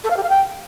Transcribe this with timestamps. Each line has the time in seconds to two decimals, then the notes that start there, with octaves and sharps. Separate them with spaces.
0.04 A4
0.10 F5
0.17 G4
0.23 F5
0.29 G5